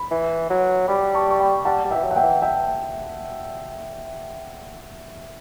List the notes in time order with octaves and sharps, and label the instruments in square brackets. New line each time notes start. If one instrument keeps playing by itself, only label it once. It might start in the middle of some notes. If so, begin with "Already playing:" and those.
Already playing: [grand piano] B5
[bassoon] E3
F#3
[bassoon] G3 [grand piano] B5 D6
[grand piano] A5 C#6
C#6
G5 B5
[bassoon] G3 [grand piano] F#5 A5
[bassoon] G3
[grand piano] E5 G5
[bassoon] E3
F#3
[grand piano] F#5
E5 G5
[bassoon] E3
[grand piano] E5 G5